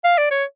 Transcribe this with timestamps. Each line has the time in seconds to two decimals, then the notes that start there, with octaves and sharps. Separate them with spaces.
0.04 F5
0.18 D5
0.31 C#5